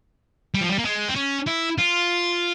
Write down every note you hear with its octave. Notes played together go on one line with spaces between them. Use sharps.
G3
F3
G3
A#3
G#3
C4
C#4
E4
F4